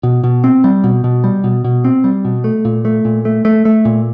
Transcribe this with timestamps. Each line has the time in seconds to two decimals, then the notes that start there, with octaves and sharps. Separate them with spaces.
0.03 B2
0.24 B2
0.44 C4
0.64 G3
0.84 B2
1.04 B2
1.24 G3
1.44 B2
1.64 B2
1.84 C4
2.04 G3
2.25 B2
2.44 A3
2.65 A#2
2.85 A3
3.05 A#2
3.25 A3
3.45 A3
3.65 A3
3.85 A#2